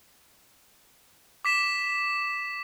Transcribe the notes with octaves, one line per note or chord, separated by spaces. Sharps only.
D6 B6 E7